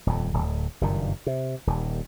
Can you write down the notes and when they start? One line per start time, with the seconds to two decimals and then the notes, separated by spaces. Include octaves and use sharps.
0.06 D#1 F2
0.33 D1
0.81 F#1 G2 A#2 D#3
1.26 C3
1.67 D#1 D#2